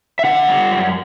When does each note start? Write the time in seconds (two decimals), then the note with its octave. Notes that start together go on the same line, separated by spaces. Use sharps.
0.19 E5
0.24 D3 F#5
0.48 G3
0.71 F#2